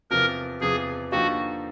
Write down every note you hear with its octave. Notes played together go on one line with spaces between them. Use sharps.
E2 C3 F3 A#4
E2 C3 F3 G#4
D3 F3 A#3 D#4 F#4 G4